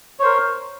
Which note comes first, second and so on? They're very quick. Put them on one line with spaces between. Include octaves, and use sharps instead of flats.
C#5 C5 A#4